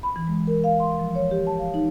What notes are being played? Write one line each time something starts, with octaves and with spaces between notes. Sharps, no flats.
B5
E3
G#3
A#4
F5
C6
F3
C#5
G4
A5
F5
D#4